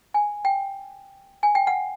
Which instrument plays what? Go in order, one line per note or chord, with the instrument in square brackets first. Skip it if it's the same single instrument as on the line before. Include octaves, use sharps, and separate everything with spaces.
[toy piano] G#5
G5
G#5
G5
F#5